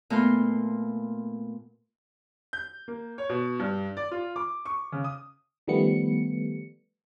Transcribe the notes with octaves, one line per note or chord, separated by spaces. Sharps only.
A#2 A3 B3 F4 C6
G6
A#3
C#5
B2
G2
D5
F4
D6
C#6
C#3
D#6
D#3 F3 G3 A3 B3 C#7